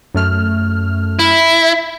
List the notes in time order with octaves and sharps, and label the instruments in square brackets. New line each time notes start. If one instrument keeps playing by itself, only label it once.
[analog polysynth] F#2 A3 F6
[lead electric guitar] E4